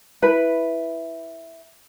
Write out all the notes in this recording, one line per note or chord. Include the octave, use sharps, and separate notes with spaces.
E4 B4